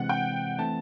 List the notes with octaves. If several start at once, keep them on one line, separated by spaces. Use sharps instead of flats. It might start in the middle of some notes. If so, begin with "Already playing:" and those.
Already playing: C3 E3 G#3 C4 F#5
G5
E3 A3 C4 A5